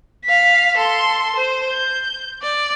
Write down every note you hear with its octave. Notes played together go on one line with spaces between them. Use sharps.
F5 B6
A4 C6
C5
G6
D5